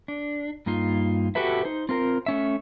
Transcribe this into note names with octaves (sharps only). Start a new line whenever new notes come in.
D4
G2 A#3 D#4 F4
F#4 G4 A4 B4 E5
D#4 C5
C4 F4 A#4
A3 C#4 E5